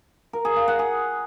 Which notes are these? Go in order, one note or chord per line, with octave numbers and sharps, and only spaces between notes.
A#4
G#4
F5
F#5
G#4